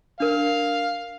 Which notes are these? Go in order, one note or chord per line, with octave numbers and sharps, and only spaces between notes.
D4 A#4 F5